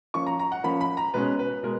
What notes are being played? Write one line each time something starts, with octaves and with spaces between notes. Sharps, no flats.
F3 A#3 C#4 C#6
A#5
A#5
F#5
F3 A#3 C#4 B5
B5
A#5
B2 G#3 C#4 B4
B4
B2 G#3 A#4